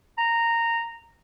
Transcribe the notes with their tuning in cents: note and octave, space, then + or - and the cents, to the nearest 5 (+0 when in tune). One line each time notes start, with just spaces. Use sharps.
A#5 -10